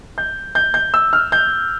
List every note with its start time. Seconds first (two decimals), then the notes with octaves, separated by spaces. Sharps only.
0.18 G6
0.55 G6
0.74 G6
0.94 E6
1.13 F6
1.32 G6